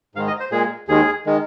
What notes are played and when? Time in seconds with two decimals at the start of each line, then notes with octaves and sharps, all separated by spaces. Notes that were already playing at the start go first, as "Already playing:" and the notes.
0.15 G#2 D#3 G#3 F5
0.27 D#5
0.40 C5
0.52 A#2 G#3 G#4
0.89 D#2 D#3 G#3 G#4
1.26 D#3 G#3